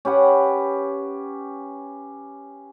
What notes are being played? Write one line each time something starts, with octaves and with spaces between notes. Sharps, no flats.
C#4 G4 B4 F#5